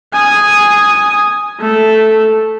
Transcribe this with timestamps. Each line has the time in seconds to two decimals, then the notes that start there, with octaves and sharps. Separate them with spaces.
0.13 G#5 D#6
1.59 A3 A4